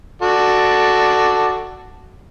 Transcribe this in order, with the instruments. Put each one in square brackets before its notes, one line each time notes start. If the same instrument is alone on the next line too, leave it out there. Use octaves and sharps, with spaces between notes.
[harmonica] F#4 A4 D5